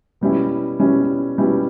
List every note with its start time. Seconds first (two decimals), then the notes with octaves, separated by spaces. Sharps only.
0.21 B2 G3 C#4 E4
0.79 B2 G3 C#4 E4
1.38 B2 G3 C#4 E4